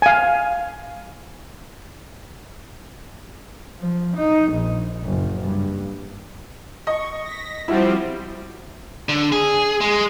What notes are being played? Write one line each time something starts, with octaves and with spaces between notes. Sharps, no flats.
F5 G#5
F3
D#4
A#1
F#1
G2
D#5 C#6
A#6 B6
F3 G3 C4 E4 F#4
D3
G#4
G#3